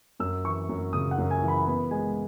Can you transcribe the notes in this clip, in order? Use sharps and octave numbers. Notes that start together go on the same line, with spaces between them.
F#2 E6
E3 C#6
F#2
C#3 D#6
F#5
F#2
G#5
E3
B5
B3 B5
G#3 G#5